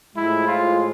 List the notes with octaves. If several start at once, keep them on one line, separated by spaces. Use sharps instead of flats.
A2 F3 G#3 E4
F4